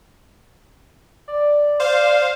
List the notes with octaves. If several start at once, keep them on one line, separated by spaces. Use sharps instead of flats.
D5
C5 F5